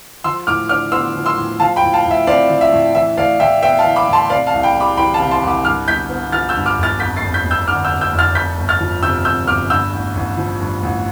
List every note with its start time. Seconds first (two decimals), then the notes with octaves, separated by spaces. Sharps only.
0.24 F3 C6 E6
0.47 A2 D6 F6
0.69 D4 D6 F6
0.92 B3 C6 E6
1.15 F3
1.26 C6 E6
1.37 A2
1.60 F3 F5 A5
1.76 G5 B5
1.83 A2
1.93 F5 A5
2.05 A2
2.11 E5
2.27 C4 D5 F5
2.49 F3
2.61 E5
2.72 A2
2.94 E3 E5
3.17 A2 D5 F5
3.39 A2 E5 G5
3.63 B3 E5 G5
3.79 F5 A5
3.84 E3
3.96 B5 D6
4.08 A2
4.13 A5 C6
4.29 C3 D5 F5
4.47 F5 A5
4.53 C2
4.63 G5 B5
4.75 G3
4.80 B5 D6
4.97 E3 G5 B5
5.14 F5 A5
5.20 C3
5.31 A5 C6
5.42 C2
5.48 B5 D6
5.65 G2 D6 F6
5.88 G1 G6 B6
6.10 B3
6.32 F3 F6 A6
6.49 E6 G6
6.56 G2
6.66 D6 F6
6.78 G1
6.83 F6 A6
7.00 F2 G6 B6
7.16 A6 C7
7.22 F1
7.34 G6 B6
7.45 F1
7.51 E6 G6
7.67 D3 D6 F6
7.85 E6 G6
7.90 F2
8.01 E6 G6
8.12 F1
8.19 F6 A6
8.35 F2 G6 B6
8.58 G1
8.69 F6 A6
8.80 F3
9.03 C3 E6 G6
9.25 F2 E6 G6
9.47 G1 D6 F6
9.70 G2 E6 G6
9.93 A1
10.15 A1
10.37 F3
10.60 G2
10.83 A1